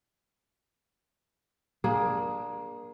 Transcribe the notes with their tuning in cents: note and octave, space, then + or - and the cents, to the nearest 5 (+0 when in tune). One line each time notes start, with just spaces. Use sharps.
A#3 +25 D4 +0 G#4 +0